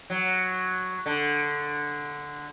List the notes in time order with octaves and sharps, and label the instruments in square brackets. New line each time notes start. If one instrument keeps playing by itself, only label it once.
[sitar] F#3
D3